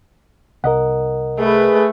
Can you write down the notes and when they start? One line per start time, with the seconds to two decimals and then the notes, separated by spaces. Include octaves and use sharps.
0.64 C2 A#4 D#5 F#5
1.39 A3 G#4 B4